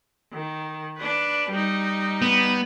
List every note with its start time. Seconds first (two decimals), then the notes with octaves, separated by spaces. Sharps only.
0.33 D#3
0.97 D4 B4
1.50 G3 D#4
2.22 B3